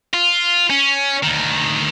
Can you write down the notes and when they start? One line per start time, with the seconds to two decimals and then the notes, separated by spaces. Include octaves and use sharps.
0.14 F4
0.70 C#4
1.23 D2 D#3